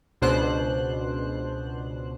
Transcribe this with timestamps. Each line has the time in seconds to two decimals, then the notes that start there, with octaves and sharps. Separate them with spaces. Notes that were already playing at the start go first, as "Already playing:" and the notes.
0.22 C#2 B2 D4 C5 F#6